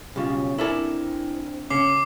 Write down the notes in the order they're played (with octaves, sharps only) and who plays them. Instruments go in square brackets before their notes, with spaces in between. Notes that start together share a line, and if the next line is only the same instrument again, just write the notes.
[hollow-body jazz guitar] B1 C#3 [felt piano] G3 F4 [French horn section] C#4
[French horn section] C4 D4 [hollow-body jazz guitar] E4 A4 D5 [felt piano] A#4 G#5
[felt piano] C#3 [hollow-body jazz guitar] C#4 [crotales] D6 C7